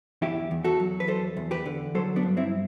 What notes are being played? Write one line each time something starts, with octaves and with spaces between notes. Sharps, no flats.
E2 E4 G4
E2
F#4 A4
F#3
B4
E2 A4 C5
E2
G4 B4
D3
F#3 A4 C5
B3 D4
G2
C4 E4